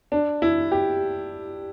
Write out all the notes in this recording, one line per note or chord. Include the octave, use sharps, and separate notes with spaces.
D4
E4
G4